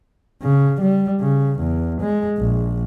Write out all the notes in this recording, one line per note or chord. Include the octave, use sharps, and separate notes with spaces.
C#3
G3
C#3
E2
G#3
A#1